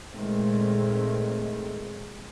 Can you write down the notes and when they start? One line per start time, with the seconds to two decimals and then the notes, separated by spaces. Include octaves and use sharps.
0.12 A#2 D#3 G#3 A3 C4